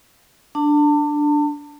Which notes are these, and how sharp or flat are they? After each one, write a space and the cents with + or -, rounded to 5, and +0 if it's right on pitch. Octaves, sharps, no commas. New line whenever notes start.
D4 +0 A5 +35